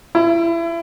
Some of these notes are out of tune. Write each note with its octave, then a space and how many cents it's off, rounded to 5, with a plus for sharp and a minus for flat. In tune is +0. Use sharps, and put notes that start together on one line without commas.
E4 +30